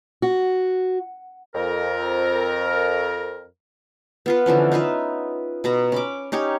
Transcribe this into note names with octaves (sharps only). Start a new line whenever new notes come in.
F#4
F2 A#4
B3 F4 B4
D3 E3 F3 C#4
D#4 F4 B4 E5
B2 A#5 B5
C#4 B5 D6
C#4 D#4 G4 C#5